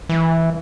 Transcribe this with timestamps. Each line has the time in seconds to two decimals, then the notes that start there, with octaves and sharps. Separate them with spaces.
0.09 E3